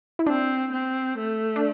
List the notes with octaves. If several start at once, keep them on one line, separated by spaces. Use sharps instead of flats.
E4
C4 D4
C4
A3
D4